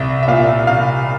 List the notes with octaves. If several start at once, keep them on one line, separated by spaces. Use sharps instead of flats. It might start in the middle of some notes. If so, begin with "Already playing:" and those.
Already playing: C2 E5
E5
A#2 F5
C2 F5